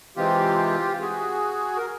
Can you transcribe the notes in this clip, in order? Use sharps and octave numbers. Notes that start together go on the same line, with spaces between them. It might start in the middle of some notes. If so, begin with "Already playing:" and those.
C3 E3 G#3 C4 F4 G4
F#4 G#4
A#4